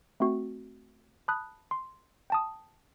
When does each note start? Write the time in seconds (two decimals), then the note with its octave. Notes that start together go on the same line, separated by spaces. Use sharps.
0.20 A3 C4 F#4
1.28 A5 B5 D#6 F#6
1.71 C6
2.30 G5 A5 D#6